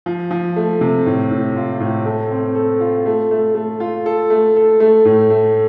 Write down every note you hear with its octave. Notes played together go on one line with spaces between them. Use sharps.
F3
F3
A3
C3
A2
A2
F4
A2
A3
C4
A4
F4
A3
A3
A3
F4
A4
A3
A4
A3
A2
A3